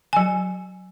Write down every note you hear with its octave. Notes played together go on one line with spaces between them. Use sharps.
F#3 G#5